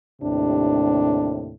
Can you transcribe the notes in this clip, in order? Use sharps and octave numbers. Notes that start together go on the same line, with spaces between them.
D#2 A2 C3 D4